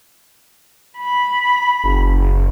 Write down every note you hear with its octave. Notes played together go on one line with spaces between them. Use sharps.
B5
F#1